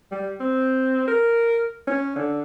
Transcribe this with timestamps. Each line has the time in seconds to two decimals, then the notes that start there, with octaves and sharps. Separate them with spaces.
0.11 G3
0.40 C4
1.08 A#4
1.87 C#4
2.16 D3